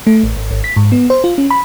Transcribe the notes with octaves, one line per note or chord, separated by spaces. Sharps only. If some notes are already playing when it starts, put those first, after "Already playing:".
A3
A1
G#1
G#1
B6
G#2
B3
C5
F4
C#4
B5